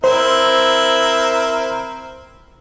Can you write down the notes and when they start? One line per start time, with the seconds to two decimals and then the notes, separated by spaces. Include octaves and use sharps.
0.04 C4 E4 A#4 C5